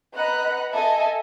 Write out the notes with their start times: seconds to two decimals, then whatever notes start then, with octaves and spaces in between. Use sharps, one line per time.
0.15 B4 D#5 F#5 A#5 B5 F#6
0.72 A4 D#5 E5 G#5